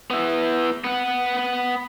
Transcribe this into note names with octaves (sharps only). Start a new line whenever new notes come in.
B3 E4
B3 F#5